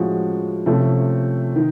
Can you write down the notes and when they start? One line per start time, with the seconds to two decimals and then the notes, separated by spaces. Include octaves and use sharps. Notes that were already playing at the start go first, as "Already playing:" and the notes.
Already playing: A2 F3 G#3 C#4 F#4
0.66 C3 F3 A3 C#4
1.56 D#3